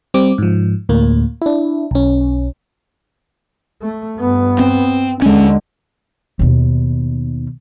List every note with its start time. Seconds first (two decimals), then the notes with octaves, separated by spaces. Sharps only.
0.14 G3 C4 D6
0.38 G#2 F3
0.89 D2 A2 A#3
1.42 D4 E4
1.91 B1 C#4
3.82 A3
4.17 G2 B3
4.59 C4
5.22 D#2 D3 G#3 C#4
6.39 D#2 B2